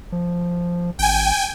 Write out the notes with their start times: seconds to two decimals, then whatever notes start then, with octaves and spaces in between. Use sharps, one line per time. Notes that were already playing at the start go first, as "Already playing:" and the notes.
0.12 F3
0.99 G#1 G5 G#5